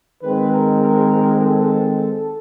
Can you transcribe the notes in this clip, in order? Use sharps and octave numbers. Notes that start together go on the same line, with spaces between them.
D#3 G#3 C4 B4
A#4
A#4
A4